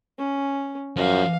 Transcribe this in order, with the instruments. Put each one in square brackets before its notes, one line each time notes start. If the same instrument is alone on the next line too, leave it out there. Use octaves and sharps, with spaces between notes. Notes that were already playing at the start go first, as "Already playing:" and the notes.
[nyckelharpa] C#4
[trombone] F#2 [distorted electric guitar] F3 F#4 [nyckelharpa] F5